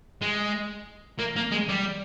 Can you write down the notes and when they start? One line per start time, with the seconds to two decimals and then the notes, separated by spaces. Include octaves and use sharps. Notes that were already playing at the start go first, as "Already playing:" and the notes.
0.21 G#3
1.19 A#3
1.36 A#3
1.52 G#3
1.69 G3